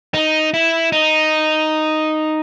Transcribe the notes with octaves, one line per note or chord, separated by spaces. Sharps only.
D#4
E4
D#4